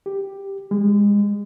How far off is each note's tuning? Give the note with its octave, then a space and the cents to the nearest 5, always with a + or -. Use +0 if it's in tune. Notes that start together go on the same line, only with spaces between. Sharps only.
G4 +5
G#3 -25